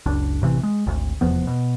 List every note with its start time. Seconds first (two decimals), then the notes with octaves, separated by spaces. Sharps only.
0.06 F#1 C#2 D4
0.42 A1 C3 E3
0.63 G#3
0.86 G#1 D2
1.21 F1 E2 F3 B3
1.47 B2